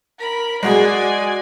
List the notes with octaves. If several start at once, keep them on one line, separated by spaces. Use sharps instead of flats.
A#4 B5
G#3 F#4 G#4 D5 G#5